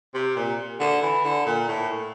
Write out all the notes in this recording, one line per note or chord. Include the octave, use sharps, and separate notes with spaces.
C3
A#2
D3
E3
D3
A#2
A2